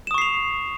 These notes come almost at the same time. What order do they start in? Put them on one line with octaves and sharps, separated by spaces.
E7 D#6 C#6 C7 F7